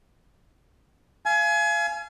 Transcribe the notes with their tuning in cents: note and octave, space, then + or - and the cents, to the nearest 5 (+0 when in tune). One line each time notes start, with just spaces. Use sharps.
F5 -30 G#5 +30